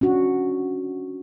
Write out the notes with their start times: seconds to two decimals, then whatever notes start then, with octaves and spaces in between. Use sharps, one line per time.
0.01 C#4 D4 F#4